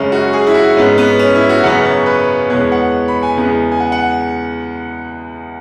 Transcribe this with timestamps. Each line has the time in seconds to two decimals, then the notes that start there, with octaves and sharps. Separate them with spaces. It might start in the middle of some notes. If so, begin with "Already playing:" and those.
Already playing: F#2 C#3 G#3 C#4
0.12 F#4
0.33 G#4
0.47 E4
0.54 F#4
0.77 G#2 G#3 B3 C#4
0.98 B3
1.19 C#4
1.35 E4
1.49 F#4
1.63 F#2 C#3 F#3 B3 F#5
1.85 C#5
2.06 B4
2.50 E2 B2 G#3 B3 C#5
2.72 F#5
3.08 B5
3.23 G#5
3.36 E2 C#3 G#3 B3
3.71 G#5
3.80 F#5
3.92 F#5